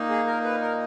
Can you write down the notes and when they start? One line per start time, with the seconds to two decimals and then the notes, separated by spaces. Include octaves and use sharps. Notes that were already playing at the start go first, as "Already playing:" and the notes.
Already playing: A#2 A#3 D#4
0.10 G#4
0.27 A#4
0.44 B4
0.61 A#4